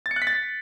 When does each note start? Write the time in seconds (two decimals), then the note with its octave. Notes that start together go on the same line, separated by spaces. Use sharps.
0.06 A6
0.11 C#7
0.16 F#6
0.22 B6
0.27 A6